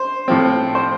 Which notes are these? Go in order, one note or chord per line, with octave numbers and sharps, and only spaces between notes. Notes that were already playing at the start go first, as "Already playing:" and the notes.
Already playing: C5
A2 F3 C4
C5